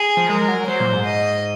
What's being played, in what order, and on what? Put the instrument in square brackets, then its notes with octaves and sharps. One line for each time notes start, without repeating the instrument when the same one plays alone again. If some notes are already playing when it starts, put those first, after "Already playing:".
Already playing: [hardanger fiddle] G#4
[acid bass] F3
[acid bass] G#3 [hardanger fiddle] A#4
[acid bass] F#3
[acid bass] F#3 [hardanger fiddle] C5
[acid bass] A#2
G#2
[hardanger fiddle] D#5